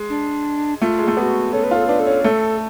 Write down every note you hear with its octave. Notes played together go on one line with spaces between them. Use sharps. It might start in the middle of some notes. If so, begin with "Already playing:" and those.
Already playing: G#3
D4
A3 F4
G#3
A3
B3 F#4 A4
C#4 A4
B4
F4 A4
D4 B4
A4
C#4
A3 A4